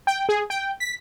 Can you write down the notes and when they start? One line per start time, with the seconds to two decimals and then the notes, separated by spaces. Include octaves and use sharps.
0.07 G5
0.29 G#4
0.50 G5
0.80 B6